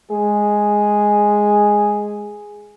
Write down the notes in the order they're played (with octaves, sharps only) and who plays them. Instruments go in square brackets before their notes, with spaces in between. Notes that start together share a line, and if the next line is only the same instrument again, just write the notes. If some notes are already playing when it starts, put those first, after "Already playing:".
[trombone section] G#3 G#4